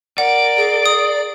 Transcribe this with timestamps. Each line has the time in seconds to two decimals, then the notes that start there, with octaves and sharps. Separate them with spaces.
0.18 A#4 D5 F#5 D7
0.57 G#4
0.86 D#6